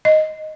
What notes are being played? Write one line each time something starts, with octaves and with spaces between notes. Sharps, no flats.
D#5